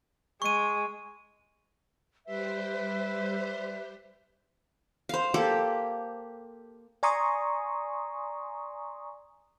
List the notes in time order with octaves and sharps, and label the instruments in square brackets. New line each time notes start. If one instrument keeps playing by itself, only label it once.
[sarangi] G#3 [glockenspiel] C#6 D#7
[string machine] G3 G4 C5 [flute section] B4 E5
[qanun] C5 F5
A#3 G4 A4
[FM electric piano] D5 G#5 A#5 C6 C#6 D#6